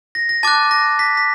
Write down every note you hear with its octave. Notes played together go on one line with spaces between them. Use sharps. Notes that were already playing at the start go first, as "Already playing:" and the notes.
A#6
A#6
A5 D6 F#6 A6
A#6
B6
B6